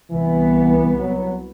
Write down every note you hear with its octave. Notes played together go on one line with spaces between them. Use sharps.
C2 E3 B3
F#3